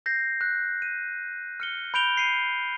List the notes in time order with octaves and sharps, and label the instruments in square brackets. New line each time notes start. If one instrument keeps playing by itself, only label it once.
[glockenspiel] G6 A#6 C7
F#6
D#7
F6 C#7 G7
B5 G6 D7 F7 G7
B5 C7 C#7 D#7